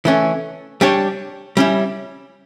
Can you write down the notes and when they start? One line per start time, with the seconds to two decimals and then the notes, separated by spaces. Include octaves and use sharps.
0.05 E3 A3 C#4
0.81 G3 D4 G4 C#5
1.57 G3 C#4 E4